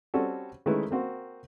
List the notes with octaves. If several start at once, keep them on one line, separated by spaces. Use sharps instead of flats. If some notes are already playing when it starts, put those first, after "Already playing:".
G3 C4 C#4 F#4 A4
D#3 G#3 A3 C#4 E4 B4
A#3 C4 F#4